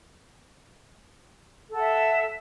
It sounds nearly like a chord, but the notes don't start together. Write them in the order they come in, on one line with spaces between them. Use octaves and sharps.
A4 F#5 E5